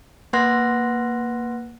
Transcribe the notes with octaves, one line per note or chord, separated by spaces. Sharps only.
A#3 B4 F#5 C6 F#6 A#6